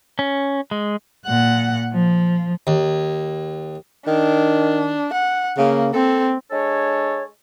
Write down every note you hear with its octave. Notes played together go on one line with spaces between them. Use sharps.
C#4
G#3
A#2 F#5
F3
D#2
D#3 D4
F#5
C#3 A#3
C4 A4
G#3 D4 A4 C#5